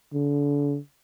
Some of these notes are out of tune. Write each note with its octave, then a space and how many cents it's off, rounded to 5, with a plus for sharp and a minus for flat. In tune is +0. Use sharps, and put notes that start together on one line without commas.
D3 -35